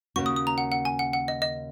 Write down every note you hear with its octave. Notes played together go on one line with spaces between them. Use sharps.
D#2 C#3 A#3 C#4 F#4 C#6
D#6
D#6
A#5
F#5
F#5
G#5
F#5
F#5
D#5
D#5